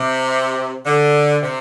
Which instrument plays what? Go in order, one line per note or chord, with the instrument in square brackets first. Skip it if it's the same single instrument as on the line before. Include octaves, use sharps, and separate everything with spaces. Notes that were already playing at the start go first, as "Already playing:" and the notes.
Already playing: [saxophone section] C3
D3
C3